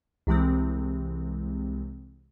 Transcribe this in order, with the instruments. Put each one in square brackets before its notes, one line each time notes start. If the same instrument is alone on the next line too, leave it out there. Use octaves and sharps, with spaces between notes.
[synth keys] C2 C3 E3 G#3 C4